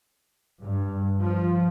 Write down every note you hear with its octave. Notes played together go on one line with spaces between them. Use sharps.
G2
F3